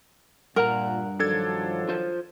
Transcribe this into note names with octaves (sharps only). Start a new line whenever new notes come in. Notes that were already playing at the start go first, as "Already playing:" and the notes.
G2 A#2 A#4 F#5 A#5
D#3 F3 F#3 D4 A4 G#6
F4 C5